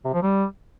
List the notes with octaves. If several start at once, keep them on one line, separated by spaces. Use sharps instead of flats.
C3
F3
G3